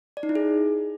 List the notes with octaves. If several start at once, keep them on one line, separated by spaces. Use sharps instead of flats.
D5
D#4
E4
G#4